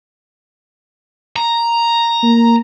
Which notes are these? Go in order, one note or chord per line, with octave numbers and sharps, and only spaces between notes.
A#5
A#3